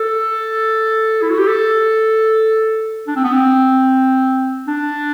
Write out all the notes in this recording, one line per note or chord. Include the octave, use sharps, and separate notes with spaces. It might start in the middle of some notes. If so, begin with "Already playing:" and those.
Already playing: A4
E4
F#4
G4
A4
D4
C4
B3
C4
D4